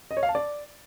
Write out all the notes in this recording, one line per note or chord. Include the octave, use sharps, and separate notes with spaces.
D#5
C#5
F5
A5
D5